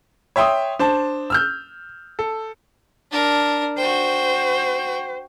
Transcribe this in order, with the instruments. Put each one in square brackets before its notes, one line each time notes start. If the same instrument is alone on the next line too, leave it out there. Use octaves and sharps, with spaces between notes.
[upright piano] C#5 E5 G5 C6 D#6
D4 C5 A5
E6 F6 G6
A4
[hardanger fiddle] D4 A#4
[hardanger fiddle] F#4 G5 [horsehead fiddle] C5